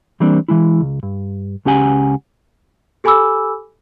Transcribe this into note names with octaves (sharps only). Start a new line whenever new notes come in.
E3 G3 A#3 C4 D4
E3 G#3 E4
C#2
G2
C#2 C#4 G4 F#5 G#5
G4 A4 G#5 B5 D6 E6